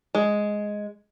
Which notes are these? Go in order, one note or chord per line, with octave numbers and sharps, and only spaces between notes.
G#3